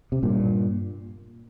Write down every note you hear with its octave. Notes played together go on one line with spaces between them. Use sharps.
C3
G2 A#2